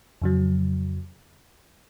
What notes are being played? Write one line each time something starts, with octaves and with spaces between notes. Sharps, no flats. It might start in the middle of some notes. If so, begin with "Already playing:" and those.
F2 C#3 F#3